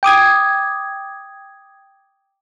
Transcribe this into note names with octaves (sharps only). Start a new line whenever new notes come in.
G5 D6 D#6 G#6